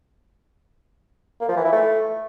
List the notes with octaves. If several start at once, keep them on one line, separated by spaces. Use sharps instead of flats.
A#3
F3
E3
E4
A3